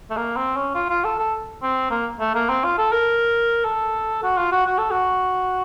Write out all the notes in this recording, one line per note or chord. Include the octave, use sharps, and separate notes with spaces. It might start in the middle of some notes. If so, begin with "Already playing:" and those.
A3
A#3
C4
C#4
F4
F4
A4
A4
C4
A#3
A3
A#3
C4
F4
A4
A#4
A4
F#4
F4
F#4
F#4
A4
F#4